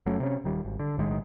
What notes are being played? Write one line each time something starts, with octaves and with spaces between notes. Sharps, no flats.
F#1 F#3 A3 C#4
C3 C#4
D#1 D#3 G3
G#1
D3
B1 A2 D#3 G#3